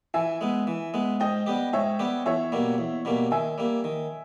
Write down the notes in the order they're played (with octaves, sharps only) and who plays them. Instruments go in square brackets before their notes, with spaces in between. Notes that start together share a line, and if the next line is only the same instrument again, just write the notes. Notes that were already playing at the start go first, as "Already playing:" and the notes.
[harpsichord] E3 [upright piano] E5 G#5
[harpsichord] G#3 B3
E3
G#3 B3
[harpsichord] G#2 [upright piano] D#5 G5
[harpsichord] G3 B3 G4
[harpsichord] G#2 [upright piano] C#5 E5
[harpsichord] G3 B3 G4
[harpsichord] E2 [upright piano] C#5 E5
[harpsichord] B2 G3 A#3
E2
B2 G3 A#3
[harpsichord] D#3 [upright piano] E5 G#5
[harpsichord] G3 A#3
D#3